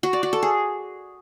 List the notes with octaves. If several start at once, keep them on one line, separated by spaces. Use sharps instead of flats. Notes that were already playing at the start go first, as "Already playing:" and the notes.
F#4
D5
F#4
A4
G#4